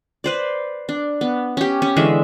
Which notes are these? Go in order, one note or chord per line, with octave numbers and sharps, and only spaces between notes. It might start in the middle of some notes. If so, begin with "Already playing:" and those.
B4 C5 D5
D4
B3
C#4 G4
C#4
D3 E3 G#3 E5